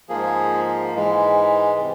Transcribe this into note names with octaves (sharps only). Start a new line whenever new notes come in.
G#2 F3 A#3 G#4
G#2 E3 G#3
C3